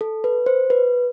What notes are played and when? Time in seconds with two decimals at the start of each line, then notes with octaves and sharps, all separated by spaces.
0.01 A4
0.24 B4
0.46 C5
0.70 B4